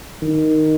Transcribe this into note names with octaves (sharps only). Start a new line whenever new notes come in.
D#3